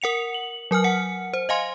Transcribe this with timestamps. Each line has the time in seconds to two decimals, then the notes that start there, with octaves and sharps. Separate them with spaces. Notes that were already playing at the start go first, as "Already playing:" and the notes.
0.02 A#4 F#5 C#7 F7
0.34 F#7
0.71 F#3 A#4 G#5 F6
0.84 F#5 C#7
1.34 C5
1.49 D#5 F5 G#5 C6